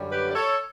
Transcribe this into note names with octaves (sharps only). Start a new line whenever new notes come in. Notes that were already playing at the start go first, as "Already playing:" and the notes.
Already playing: F#2 D3 G3 C#4
G4 B4
D5
A4 C#5